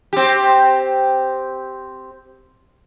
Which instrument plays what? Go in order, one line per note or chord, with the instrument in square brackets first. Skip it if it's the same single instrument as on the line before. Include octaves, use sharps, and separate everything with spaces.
[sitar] C4 G4